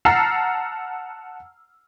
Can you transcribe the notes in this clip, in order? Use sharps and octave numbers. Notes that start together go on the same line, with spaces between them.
F#5 A5 A#5 E6 F6 C7